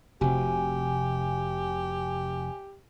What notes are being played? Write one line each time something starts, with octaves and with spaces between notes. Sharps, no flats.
F1 C3 F#4 G4 G#5